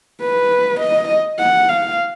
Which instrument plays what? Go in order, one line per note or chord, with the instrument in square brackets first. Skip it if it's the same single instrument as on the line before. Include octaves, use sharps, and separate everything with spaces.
[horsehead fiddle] B4
D#5
F#5
F5